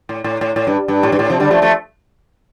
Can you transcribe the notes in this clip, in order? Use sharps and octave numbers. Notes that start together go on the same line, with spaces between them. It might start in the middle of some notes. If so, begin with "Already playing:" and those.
A2
A2
A2
A2
G2
G2
A2
G2
A2
C3 F3
D3 G3
F3 A3
F3 A3